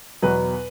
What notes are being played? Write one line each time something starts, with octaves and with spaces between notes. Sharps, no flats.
E2 B2 F#3 B4